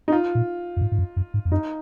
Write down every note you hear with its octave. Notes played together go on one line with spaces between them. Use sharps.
D#4
F4
A#2
F#2
G#2
G#2
F#2
F#2
G#2
F2
F#2 D#4